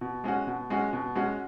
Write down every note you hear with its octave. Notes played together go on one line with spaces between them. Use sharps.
B2
G#3 C#4 F#4
B2
G#3 C#4 F#4
B2
G#3 C#4 F#4